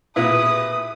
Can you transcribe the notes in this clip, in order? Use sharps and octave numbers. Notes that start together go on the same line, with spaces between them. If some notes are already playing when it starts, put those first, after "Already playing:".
A#2 B3 E4 G4 G#4 B4 E5 D#6